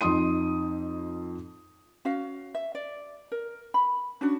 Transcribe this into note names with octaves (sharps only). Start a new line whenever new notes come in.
F2 D#4 C6 D#6 D#7
C#4 F#4 F5
E5
D5
A#4
B5
C#4 D4 F#4